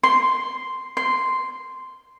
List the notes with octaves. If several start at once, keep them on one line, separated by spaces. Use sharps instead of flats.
C6
C6